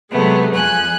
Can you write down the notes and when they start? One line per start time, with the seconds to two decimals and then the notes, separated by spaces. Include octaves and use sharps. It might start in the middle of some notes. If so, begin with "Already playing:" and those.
0.12 C3 F#3 G#3 A3 B3
0.53 F2 G#5 F#6